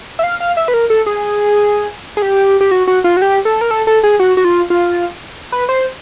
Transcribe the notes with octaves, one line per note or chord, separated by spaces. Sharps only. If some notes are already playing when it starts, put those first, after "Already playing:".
E5
F5
F5
E5
B4
A#4
A4
G#4
G#4
G4
G4
F#4
F#4
F4
F#4
G4
A4
A#4
A4
A4
G#4
F#4
F#4
F4
F4
B4
C5